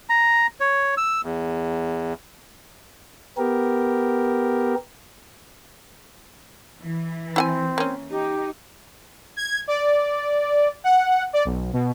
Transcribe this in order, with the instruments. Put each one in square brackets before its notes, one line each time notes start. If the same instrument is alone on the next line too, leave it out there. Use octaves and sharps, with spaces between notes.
[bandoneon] A#5
C#5
E6
E2
[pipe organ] B3 G4 A#4
[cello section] E3
[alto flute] C4 [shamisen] E4 F#5 G#5
[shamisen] A#3 C#4
[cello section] D#4 [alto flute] G4
[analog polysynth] G#6
D5
F#5
D5
B1
B2